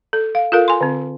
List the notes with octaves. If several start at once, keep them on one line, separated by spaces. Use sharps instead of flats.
A4
F5
F4 A4 A#4 F5
G#5 C6
D3 C4